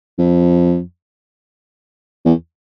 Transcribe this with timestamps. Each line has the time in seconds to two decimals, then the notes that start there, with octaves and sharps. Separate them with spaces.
0.19 F2
2.26 E2